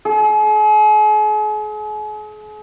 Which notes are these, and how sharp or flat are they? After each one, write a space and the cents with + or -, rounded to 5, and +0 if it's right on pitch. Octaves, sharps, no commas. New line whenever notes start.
G#4 +40